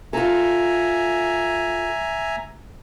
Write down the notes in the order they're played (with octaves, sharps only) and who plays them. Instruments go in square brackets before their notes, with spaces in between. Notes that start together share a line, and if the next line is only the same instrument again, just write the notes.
[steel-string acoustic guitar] F4 A4 [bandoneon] E5 G#5 A#5